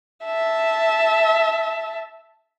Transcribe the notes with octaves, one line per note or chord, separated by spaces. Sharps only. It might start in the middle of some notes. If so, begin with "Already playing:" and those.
E5 A5